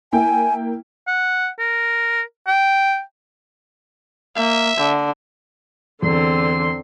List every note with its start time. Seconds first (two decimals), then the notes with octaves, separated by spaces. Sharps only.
0.13 A#3 E4 G5 G#5
1.07 F#5
1.59 A#4
2.47 G5
4.36 A#3 E5
4.77 D3
6.02 E2 D3 C4 C6